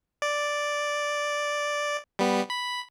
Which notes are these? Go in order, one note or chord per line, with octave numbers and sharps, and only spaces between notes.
D5
G3 B3
B5